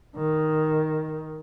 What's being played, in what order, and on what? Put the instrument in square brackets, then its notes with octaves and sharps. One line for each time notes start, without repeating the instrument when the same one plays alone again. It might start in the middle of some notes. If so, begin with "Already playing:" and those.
[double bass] D#3